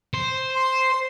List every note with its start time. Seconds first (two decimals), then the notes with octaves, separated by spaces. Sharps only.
0.14 C5
0.55 C6